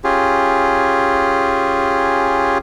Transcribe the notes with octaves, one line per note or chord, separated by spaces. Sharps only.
C#4 F4 G4 G#4